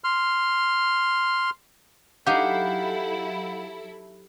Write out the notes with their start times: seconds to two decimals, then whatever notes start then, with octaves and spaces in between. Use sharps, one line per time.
0.04 C6 F6
2.26 F#3 D#4 E4 G4 A4 F5 F#5 G6